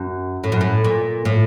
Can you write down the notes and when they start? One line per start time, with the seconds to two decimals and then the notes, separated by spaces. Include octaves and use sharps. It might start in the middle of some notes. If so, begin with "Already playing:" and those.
Already playing: F#2
0.44 A2
0.52 F#2
0.61 A2
0.84 A#2
1.25 A2